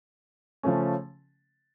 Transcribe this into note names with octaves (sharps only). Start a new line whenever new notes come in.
C#3 F3 A3 C#4